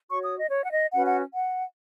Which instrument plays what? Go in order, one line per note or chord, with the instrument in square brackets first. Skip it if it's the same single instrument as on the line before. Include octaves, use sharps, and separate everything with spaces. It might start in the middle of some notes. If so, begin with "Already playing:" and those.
[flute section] F#4 C#5 C#6
D#6
D#5
C#5
F#5
D#5
C#4 F#4 B4 F#5
F#5
F#5